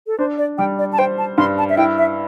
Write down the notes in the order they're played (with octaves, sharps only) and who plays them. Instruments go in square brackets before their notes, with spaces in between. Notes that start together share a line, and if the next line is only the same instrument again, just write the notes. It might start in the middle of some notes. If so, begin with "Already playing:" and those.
[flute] A4
[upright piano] D4 [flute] C5
[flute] D5
[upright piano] G3 [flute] G5
[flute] D5
A5
[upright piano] C5 [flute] G5
[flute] A5
[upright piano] G2 [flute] C6
[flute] A5
E5
[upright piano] E4 [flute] G5
[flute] E5